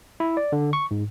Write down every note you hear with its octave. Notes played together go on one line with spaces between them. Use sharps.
E4
D5
D3
C#6
G#2